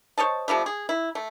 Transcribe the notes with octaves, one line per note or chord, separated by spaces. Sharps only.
C5 C#5 D#5 A5
C3 F3 G3 A3
G#4
E4
A3